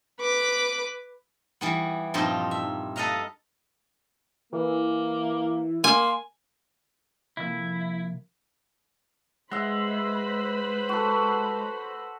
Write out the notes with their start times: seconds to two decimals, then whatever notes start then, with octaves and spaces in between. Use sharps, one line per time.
0.20 B4 D6
1.61 E3 G3 B3
2.14 G2 A#2 F3 C4 D#4 G4
2.51 E5
2.96 A4 B4 D#5 F5 A#5
4.53 E3 A#3
5.84 A#3 G#5 C6
7.37 C3 F3 A#3 E4
9.51 G#3 B4 C5 E5 F#5 B5
10.89 F#4 A4